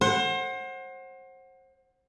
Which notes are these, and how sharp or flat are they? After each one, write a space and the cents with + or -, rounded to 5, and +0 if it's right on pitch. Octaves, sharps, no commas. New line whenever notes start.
C5 +30 F#5 +0